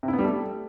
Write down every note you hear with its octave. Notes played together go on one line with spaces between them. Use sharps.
C3
E4
B3
G3
A3